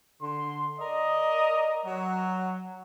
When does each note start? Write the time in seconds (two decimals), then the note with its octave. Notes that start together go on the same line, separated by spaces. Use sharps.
0.22 D3 C6
0.79 A#4 D5 D#5
1.86 F#3